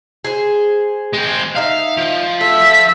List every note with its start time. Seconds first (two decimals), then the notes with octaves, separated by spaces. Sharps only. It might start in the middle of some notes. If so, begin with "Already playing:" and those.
0.25 G#4 C5
1.13 G#3 C4
1.56 D#4 E5 F5
1.98 F3
2.41 A3 E5 B6